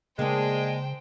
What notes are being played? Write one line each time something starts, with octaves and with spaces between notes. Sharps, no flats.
C#3 G#3 A#3 D4 C5 G5